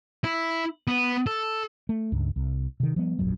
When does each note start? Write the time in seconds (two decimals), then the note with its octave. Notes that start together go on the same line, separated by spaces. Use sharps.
0.24 E4
0.88 B3
1.26 A4
1.89 A3
2.12 C#2 G2
2.36 C2
2.80 C3 D#3
2.96 F3 G3 B3
3.19 E1 A#1 F#2 F#3